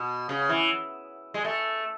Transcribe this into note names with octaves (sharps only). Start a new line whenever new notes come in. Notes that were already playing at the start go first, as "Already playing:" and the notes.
Already playing: B2
C#3
E3
G#3
A3